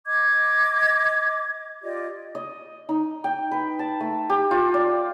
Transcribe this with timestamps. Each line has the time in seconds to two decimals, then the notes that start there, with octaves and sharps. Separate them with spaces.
0.07 D#5 D6 G#6
1.83 F4 G4 D5 D#5
2.35 D#5
2.89 D#4
3.24 G5
3.51 B4
3.79 A5
4.00 A3
4.30 G4
4.51 F4
4.74 D5